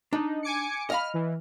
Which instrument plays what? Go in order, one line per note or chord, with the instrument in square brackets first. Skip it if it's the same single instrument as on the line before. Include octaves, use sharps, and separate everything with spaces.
[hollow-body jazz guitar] D4 [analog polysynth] D#4
[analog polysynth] G#5 D6 C#7
[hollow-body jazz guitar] D#5 F5 B5 [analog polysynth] F6
[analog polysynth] E3